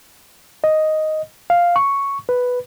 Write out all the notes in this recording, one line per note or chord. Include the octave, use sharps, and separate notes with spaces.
D#5
F5
C#6
B4